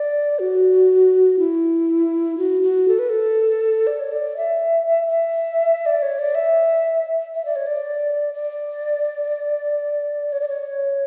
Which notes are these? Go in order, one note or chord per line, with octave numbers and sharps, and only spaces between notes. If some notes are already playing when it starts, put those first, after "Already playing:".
Already playing: D5
F#4
E4
F#4
F#4
A4
B4
A4
D5
C#5
D5
E5
E5
E5
D5
C#5
D5
E5
E5
D5
C#5
D5
D5
C#5
D5
C#5